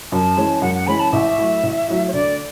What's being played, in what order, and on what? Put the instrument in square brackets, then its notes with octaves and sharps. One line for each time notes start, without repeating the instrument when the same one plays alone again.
[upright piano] F#2 [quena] A5
[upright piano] E3 G#3 C#4
[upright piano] F#2 [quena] F#5
[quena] F#5
[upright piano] E3 G#3 C#4 [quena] B5
[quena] A5
[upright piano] A1 [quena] E5
[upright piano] A2 F#3
A1
A2 F#3
[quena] C#5
[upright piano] D2 [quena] D5